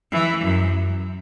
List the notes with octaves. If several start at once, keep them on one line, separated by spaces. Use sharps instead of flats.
E3
F#2